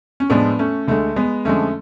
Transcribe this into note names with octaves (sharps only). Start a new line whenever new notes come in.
C#4
A2 F3 G#3 B3 D4
A3 C#4
D2 D3 G#3 A3
G#3 B3
F2 D3 F3 G#3 A3 C#4